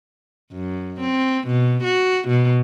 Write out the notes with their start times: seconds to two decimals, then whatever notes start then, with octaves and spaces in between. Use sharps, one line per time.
0.53 F#2
1.01 C4
1.47 B2
1.84 F#4
2.28 B2